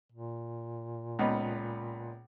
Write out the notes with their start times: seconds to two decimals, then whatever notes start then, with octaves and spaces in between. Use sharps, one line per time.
0.12 A#2
1.19 C#2 B3 D#4